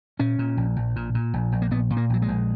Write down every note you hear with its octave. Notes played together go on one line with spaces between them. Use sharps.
A#2 C#4
A#2
A#1
A#1
A#2
A#2
A#1
A#1
A#3
A#2 B3
A#2
A#3
A#1 F#3
G#3
A#1